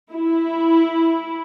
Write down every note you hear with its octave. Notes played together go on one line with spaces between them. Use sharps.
E4